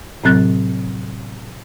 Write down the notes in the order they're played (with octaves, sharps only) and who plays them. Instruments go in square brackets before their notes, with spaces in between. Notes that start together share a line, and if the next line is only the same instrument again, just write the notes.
[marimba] A2 C3 F#3 C4 F#6 A6